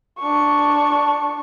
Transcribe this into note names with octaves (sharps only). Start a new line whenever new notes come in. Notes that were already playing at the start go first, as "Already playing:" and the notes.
D4 C#6